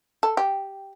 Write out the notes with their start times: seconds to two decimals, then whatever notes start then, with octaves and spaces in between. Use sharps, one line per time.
0.23 A4
0.37 G4